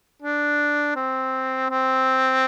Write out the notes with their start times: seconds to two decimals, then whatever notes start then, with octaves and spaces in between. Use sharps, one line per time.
0.22 D4
0.96 C4
1.70 C4